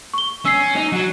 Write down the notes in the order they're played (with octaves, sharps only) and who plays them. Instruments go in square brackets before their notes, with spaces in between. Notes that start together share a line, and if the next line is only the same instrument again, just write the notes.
[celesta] C#6 G7
[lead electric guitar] C#4 [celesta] E6 C7
[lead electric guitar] D#4
F#3